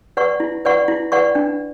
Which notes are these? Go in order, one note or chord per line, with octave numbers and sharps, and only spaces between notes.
B4 D5 F#5 C#6
E4
B4 D5 F#5 C#6
E4
B4 D5 F#5 C#6
D4